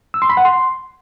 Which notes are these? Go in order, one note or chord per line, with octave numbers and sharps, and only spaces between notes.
E6
C6
B5
F#5
C6